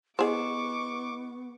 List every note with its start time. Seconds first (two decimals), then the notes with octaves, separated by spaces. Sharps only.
0.19 B3 E4 G#4 C5 D#5 C#6 D6